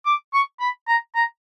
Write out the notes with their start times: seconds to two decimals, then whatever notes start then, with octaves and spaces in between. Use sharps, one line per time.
0.06 D6
0.33 C#6
0.60 B5
0.88 A#5
1.15 A#5